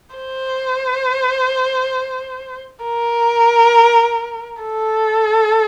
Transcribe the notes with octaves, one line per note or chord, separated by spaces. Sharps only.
C5
A#4
A4